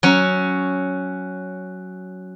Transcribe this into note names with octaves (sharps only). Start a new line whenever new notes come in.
F#3 C#4